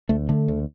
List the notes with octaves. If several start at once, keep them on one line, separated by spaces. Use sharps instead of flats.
D2 A3
D3 A3
D2